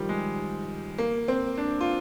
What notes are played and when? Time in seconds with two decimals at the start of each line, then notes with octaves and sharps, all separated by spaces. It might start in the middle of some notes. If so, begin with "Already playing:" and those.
Already playing: D#3 F3 G3
0.09 G#3
0.98 A#3
1.28 C4
1.58 D4
1.81 F4